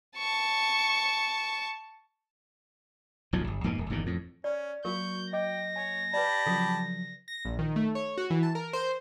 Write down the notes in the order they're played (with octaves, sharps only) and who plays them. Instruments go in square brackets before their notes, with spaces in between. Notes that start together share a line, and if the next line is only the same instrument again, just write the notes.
[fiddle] A5 C#6
[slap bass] D1 B1 F2 F3
G1
E2 G#2 B2 A#3
D1
G1 E2 A#2 D#3
F2 A2
[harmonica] C#4 [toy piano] D5
[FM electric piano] F#3 A#3 [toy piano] F#4 A#4 [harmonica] C#6 [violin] G6
[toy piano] D#5 D6 [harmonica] G5 [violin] A#6
[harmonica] C#5 [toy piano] G#5
[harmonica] G4 A5 B5 [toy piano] B4 D5
[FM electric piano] C#3 F3 F#3 [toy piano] A4
[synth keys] A#6
A#1
D#3
A3
C#5
F#4
E3
A5
A#4
C5